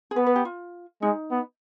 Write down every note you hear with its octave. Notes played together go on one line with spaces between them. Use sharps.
G#4
B3 B4
B4
G4
F4
G#3 D#4
B3